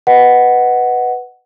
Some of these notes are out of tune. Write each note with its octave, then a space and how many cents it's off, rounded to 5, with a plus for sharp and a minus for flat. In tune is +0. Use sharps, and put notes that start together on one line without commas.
B4 +0 D#5 +0 F#5 +5